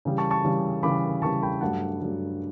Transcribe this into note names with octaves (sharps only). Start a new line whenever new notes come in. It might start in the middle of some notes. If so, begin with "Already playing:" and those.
C#3 E3 G3
A5 C#6
A5 C#6
C#3 E3 G3
C#3 E3 G3 B5 D6
C#3 E3 G3 A5 C#6
G5 B5
G2 F#3 A3 F#5 A5
G2 F#3 A3